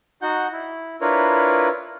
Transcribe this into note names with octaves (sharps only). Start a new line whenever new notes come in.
D#4 F#4 F#5 G6
E4
D4 E4 F4 A#4 B4 C#5